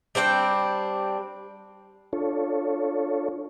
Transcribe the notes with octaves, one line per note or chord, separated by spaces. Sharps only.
G3 C4 D4 G5
D4 F4 A4 C#5